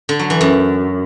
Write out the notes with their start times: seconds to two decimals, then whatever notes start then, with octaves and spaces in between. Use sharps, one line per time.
0.09 D3
0.19 F#3
0.30 E3
0.41 F#2